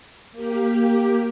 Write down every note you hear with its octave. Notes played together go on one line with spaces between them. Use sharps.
A#3 G4